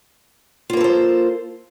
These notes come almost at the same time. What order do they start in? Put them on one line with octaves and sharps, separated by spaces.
F4 A#3 B4 A4 C5